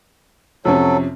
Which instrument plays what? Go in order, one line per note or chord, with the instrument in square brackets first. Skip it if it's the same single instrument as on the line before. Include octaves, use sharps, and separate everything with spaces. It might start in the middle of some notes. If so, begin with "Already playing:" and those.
[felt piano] F2 C3 C#4 [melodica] F#3 A4